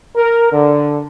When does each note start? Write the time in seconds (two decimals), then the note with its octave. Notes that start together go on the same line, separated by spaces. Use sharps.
0.17 A#4
0.52 D3